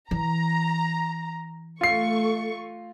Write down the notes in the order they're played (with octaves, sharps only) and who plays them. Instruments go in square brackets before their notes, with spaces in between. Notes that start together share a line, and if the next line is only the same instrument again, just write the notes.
[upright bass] E3 [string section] A#5
[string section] A3 C#6 [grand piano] F4 C7